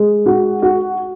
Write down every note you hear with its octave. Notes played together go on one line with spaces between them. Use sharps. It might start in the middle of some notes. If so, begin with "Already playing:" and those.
Already playing: G#3
F#4
F#4